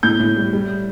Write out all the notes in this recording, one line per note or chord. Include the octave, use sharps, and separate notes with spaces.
A2 G6
A2
G3
G3